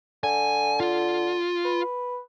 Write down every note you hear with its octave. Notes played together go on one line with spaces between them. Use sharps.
D3 G#5
F4
B4